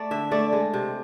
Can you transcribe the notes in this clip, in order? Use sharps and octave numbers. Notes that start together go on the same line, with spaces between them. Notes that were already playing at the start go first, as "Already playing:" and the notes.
Already playing: A3 D5
D3 E5
A3 D5
G#3
C3